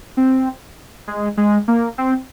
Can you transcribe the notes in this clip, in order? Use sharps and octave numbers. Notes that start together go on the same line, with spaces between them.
C4
G#3
G#3
A#3
C4